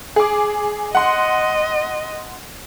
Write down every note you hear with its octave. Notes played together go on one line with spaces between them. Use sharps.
G#4 D6
D#5 F#5 C6